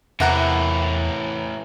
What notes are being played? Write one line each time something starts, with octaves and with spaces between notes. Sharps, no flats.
E2 A2 C3 E3 A#4 F#5 A#5